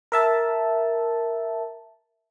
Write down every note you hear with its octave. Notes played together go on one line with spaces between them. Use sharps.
A#4 E5 A5